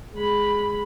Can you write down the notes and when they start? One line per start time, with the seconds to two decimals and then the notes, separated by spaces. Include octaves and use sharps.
0.14 G#3 B5